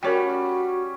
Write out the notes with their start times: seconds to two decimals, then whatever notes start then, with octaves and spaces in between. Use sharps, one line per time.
0.03 G3 C#4 F#4 A#4 C#5 G5